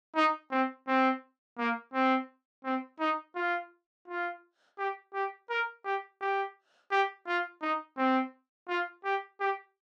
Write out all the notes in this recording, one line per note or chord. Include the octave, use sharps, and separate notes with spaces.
D#4
C4
C4
A#3
C4
C4
D#4
F4
F4
G4
G4
A#4
G4
G4
G4
F4
D#4
C4
F4
G4
G4